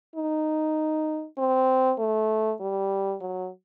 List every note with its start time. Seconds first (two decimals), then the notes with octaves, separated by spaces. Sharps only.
0.16 D#4
1.38 C4
1.99 A3
2.60 G3
3.21 F#3